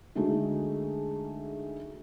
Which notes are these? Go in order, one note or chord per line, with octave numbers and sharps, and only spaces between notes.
D3 G#3 A3 D#4 F#4 G#4